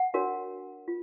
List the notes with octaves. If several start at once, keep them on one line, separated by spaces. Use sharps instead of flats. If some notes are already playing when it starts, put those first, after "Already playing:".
Already playing: F#5
D4 F#4 A#4 C#5
F4